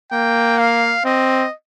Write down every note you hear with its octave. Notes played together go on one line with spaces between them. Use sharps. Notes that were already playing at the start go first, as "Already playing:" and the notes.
A#3 G5
F5
C4 D#5